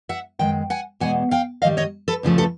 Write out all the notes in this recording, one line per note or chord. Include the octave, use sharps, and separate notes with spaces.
E5 F#5
F#2 D#3 G#3 G5
F#5 G#5
E2 B2 G#3 F#5 G#5
F5 G5
G#2 D#3 G3 D#5 F5
C#5 D#5
A4 B4
D2 C#3 F3 A3
A4 B4